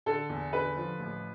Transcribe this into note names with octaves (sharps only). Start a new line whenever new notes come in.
D3 A4
E2
D3 B4
F3
A1